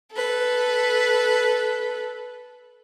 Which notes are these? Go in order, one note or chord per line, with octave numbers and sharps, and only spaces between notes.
A4 B4